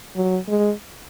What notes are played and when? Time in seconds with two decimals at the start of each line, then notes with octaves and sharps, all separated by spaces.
0.15 F#3
0.48 G#3